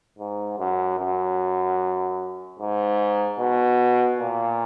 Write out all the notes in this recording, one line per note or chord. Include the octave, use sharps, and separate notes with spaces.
G#2
F#2
F#2
G#2
B2
A#2